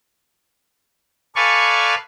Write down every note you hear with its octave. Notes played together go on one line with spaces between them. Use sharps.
A4 B4 D5 F5 G#5 C#6